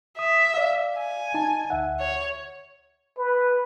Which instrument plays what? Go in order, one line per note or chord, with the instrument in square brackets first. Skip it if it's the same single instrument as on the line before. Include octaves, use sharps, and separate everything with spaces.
[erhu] E5 [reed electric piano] D#6
[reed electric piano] D5 F5
[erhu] G#5
[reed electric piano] D#4 A5
D2 E5 F#5
[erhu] C#5
[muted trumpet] B4